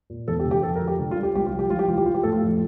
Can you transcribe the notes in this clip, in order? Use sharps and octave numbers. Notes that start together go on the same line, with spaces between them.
A#2
E2 A4
G4
D3
G4
F2 A4
A#4
F3
G4
D3
F4
G3
G4
C2 G4
F4
F3
G4
E3 F4
G4
E3 F4
G4
F3 F4
G4
A2 A4
F4
F2